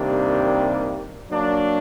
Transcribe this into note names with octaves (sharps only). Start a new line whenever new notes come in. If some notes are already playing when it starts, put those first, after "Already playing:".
Already playing: C3 D#3 G3 A#3 D4
F#3 A#3 D4